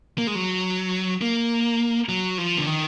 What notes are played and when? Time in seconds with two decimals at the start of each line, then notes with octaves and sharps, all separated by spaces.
0.18 A#3
0.27 G#3
0.35 F#3
1.21 A#3
2.09 F#3
2.38 F3
2.58 D3
2.67 D#3